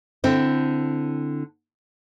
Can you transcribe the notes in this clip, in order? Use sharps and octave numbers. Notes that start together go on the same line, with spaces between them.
D3 C4 E4